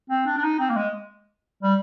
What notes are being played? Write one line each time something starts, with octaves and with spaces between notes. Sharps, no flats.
C4
D4
D4
D#4
C4
A#3
G#3
G3